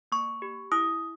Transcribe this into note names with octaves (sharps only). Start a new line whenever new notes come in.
A#3 C#6
G4
E4 D#6